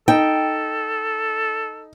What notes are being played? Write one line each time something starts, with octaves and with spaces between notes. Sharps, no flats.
D#4 A4 G5